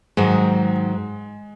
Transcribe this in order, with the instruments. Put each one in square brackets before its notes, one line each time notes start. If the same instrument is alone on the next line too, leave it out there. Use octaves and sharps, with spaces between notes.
[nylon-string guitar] G#2 D#3 F#3 [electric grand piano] G#3